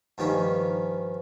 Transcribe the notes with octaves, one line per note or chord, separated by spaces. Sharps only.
G2 D#3 F3 C#4 G4